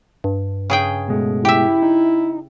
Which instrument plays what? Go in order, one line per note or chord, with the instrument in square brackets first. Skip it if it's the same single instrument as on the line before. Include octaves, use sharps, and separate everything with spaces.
[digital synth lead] G2
[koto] C#3 G#4 G5
[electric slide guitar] B2 G#3 A3
[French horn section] E4 [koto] G4 E5
[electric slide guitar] D#4